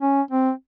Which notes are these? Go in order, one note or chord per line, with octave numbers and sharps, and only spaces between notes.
C#4
C4